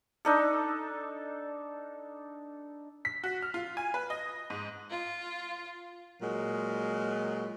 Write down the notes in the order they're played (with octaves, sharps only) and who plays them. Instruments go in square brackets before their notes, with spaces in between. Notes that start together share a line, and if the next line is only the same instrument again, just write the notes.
[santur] D4 D#4 A4
[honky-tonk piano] B6
F#4
F6
F4
G#5
B4
D#5
G#2
[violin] F4
[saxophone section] A#2 F#3 G#3